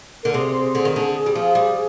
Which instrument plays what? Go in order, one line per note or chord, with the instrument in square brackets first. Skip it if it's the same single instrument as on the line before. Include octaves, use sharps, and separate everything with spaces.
[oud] D3 [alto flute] A#4
[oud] C3 [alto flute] G#4
[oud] D3
D#3
D3
G3
F3
G3